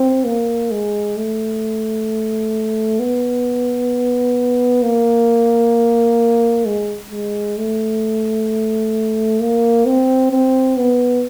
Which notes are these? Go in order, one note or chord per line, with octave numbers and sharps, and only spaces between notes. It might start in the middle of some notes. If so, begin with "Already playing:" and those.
Already playing: C4
A#3
G#3
A3
B3
A#3
G#3
G#3
A3
A#3
C4
C4
B3